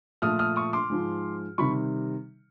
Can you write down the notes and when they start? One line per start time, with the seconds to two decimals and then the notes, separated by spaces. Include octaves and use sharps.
0.22 A#2 F3 A3 D#6 F6
0.39 D#6 F6
0.56 C#6 D#6
0.73 C6 D6
0.90 G#2 F3 G#3
1.58 C3 D#3 G3 B5 C#6